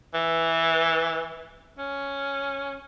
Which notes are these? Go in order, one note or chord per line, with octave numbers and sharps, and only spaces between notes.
E3
C#4